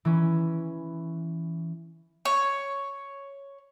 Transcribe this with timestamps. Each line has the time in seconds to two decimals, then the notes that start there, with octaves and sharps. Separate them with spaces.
0.05 E3 C#4
2.25 C#5